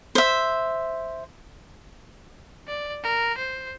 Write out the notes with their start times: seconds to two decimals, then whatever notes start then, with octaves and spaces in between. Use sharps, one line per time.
0.15 C5 E5
2.68 D5
3.04 A#4
3.38 C5